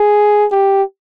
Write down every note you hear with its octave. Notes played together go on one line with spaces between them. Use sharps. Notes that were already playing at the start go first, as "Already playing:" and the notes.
Already playing: G#4
G4